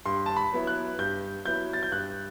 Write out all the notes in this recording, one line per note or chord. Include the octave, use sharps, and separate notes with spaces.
G2 C6
A5
B5
F#3 B3 E4
F#6
G2 G6
F#3 B3 E4 G6
A6
G6
G2 F#6